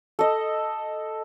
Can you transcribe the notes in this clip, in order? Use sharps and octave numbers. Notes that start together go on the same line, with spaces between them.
A4 D#5